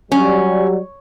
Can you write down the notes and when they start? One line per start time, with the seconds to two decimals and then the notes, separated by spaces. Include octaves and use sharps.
0.12 F#3 G3 C#4